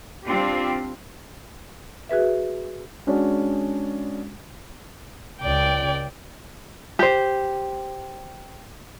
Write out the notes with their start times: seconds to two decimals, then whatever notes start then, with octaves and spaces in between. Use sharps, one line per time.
0.25 G3 C4 D4 F4 G4
2.09 F#4 G#4 B4 E5
3.07 G#3 C#4 D4 F#4
5.41 C#2 D5 G5
6.99 G4 C5